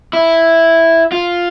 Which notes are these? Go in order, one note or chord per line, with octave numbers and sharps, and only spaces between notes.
E4
F4